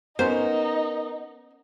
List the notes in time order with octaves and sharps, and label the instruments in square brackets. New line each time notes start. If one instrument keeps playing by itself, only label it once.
[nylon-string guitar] B3 A#4 [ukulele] C#4 C5 [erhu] D#4